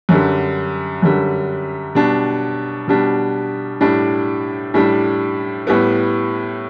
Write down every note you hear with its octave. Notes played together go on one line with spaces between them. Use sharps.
F#2 D3 G3
F#2 D3 G3
B2 G3 D4
B2 G3 D4
A2 G3 D4
A2 G3 D4
A2 G3 B3